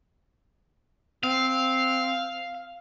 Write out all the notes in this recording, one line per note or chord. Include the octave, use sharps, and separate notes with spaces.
C4 F5